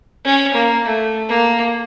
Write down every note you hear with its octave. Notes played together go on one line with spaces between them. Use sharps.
C#4
A#3
A3
A#3